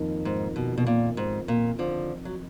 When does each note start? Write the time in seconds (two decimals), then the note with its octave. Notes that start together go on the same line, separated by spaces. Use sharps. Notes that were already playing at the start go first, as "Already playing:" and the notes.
Already playing: F2 D#3 A#3 D#4
0.25 G#2
0.56 B2
0.78 B2
0.87 A#2
1.17 G#2
1.48 A#2
1.79 D3 F3
2.25 F#3